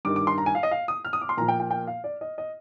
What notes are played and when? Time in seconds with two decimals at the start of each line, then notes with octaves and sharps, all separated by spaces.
0.05 G2 D6
0.08 D#3
0.16 D6
0.27 C6
0.38 A#5
0.46 G#5
0.55 F5
0.63 D#5
0.71 F5
0.88 D#6
1.05 F6
1.13 D#6
1.21 D6
1.29 C6
1.37 A#2 A#5
1.41 F3
1.48 G5
1.60 G5
1.71 G5
1.87 F5
2.04 D5
2.21 D#5
2.38 D#5